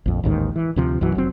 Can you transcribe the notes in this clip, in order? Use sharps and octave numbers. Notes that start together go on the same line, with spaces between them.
A#1 F2
A1 D#2 G#2 D#3
E3
D2 C3 F3
B1 F#2 E3 F#3
F1 F#3 C4